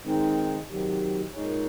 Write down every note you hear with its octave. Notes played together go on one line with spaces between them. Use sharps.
D#3 G#3 C4 D#4
C3 D#3 F#3
A#2 G#3 D#4 G#4 C#5